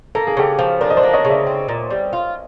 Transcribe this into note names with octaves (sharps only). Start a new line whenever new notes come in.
A#3 A4
G#4
C#3 G4 A4
F3
D4 A#4 C5
D#5
C5 D5
A#3
C#5 D#5
C#3
D5 E5
C4
A#2
G3
F4